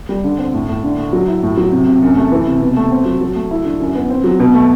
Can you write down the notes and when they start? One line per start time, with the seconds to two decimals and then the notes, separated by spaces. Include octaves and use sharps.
0.09 G3
0.24 D3
0.38 C4
0.54 A2
0.69 A2
0.83 D3
0.98 A3
1.13 F#3
1.28 E4
1.43 A2
1.57 F#3
1.72 C3
1.87 C3
2.02 F#2
2.16 A3
2.32 E3
2.47 C3
2.61 B2
2.77 A3
2.92 C4
3.05 F#3
3.21 F#3
3.36 A3
3.51 E4
3.65 D3
3.80 F#2
3.95 B3
4.10 C4
4.24 F#3
4.40 B2
4.54 A3